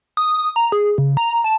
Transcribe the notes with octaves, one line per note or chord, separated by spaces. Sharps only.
D#6
A#5
G#4
C#3
A#5
A5